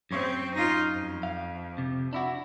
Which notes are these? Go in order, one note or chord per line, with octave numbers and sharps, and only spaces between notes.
F#2 C4 C#5
D#4 F4
F2
F5
C3
D4 E4 F#4